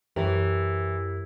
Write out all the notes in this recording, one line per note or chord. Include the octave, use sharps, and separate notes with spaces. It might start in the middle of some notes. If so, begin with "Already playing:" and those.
F#2 E3 G4 A#4 C#5